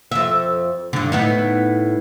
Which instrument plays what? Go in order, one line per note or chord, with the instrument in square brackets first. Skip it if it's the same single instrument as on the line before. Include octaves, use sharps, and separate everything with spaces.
[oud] F2 E5
G2 D3
A2 B3 D#4